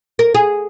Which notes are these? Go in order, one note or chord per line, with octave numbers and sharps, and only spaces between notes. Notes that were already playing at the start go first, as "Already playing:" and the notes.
A#4
G#4